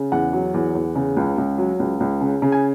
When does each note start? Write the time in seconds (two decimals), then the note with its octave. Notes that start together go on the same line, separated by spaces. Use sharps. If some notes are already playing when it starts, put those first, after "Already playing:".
Already playing: C#3
0.12 E2 F#5
0.33 F#3
0.54 E2
0.75 E2
0.96 C#3
1.17 C#2
1.38 C#2
1.58 F#3
1.80 C#2
2.00 C#2
2.21 C#3
2.42 C#3
2.52 G#5